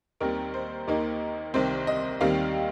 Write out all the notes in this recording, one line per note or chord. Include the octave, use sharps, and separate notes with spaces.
D#2 D#3 G3 C4 A#4
C5
D#2 D#3 A#3 D#4
C2 C3 D#3 C4 C5
D#5
D#2 D#3 G3 C4 F5